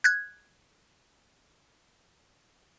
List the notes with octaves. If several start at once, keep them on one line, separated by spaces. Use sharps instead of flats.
F#6 G#6